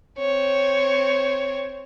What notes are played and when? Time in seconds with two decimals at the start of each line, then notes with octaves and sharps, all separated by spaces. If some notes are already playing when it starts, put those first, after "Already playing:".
0.19 C4 C#5